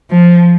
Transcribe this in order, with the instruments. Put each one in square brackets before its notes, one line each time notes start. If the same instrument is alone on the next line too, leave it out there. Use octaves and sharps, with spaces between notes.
[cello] F3